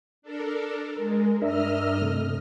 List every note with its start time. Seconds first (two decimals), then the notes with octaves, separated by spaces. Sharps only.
0.22 D4 A4 A#4
0.97 G#3 A#4
1.42 G2 D4 A#4 D#5 E5 F6
2.02 C3 A3